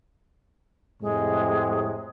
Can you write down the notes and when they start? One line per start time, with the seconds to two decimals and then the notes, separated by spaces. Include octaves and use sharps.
1.01 F2 A2 C3 G#3